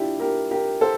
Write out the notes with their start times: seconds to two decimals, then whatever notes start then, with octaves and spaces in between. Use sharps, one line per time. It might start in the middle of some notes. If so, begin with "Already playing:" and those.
Already playing: D4 E4 F4 G4
0.20 G4 A#4
0.51 G4 A#4
0.81 A4 C5